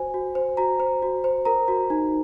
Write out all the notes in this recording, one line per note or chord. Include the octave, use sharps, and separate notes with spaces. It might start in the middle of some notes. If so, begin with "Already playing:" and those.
Already playing: F#4 C5 G#5
F#4
C5
F#4 A#5
C5
F#4
C5
A#4 A#5
F#4
D#4